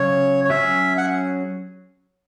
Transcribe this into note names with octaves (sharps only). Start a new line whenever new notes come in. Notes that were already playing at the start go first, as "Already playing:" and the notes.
Already playing: C#3 F#3 C#4 C#5
C#5
F#3 C#4 G#4 E5
F#5